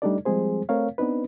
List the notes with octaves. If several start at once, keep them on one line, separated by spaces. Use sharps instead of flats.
G3 A3 D4 D#4 A4 D5
F3 G3 G#3 C4 G#4 C5
A3 C4 A#4 C#5 F5
B3 C4 D4 D#4 B4